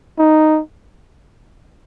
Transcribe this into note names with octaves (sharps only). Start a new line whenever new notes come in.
D#4